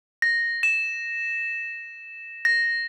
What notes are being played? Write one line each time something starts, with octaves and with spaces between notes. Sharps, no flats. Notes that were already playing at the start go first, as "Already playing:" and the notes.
A#6
E7
A#6